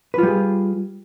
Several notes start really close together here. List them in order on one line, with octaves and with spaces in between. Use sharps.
B4 F4 G3 G#4